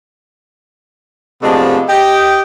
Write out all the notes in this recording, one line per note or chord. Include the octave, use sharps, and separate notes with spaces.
C3 F3 G#3 A3 B3 D4
G4 D#5 G5